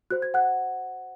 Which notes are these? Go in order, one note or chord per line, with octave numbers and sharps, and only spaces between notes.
F#4 C5 F#6
G#6
F#5 F#6